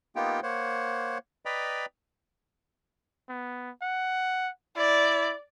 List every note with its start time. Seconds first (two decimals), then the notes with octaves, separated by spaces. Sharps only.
0.16 A#3 B3 D#4 F4 G4 G5
0.43 A#3 C5 C#5 F#5
1.45 B4 D5 D#5 G5 A#5 B5
3.29 B3
3.82 F#5
4.77 E4 D5